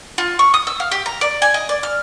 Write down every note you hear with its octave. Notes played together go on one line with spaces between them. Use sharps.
F4
C#6
D#6
E6
F5
G4
A#5
D5
G#5
D#5
D5
F6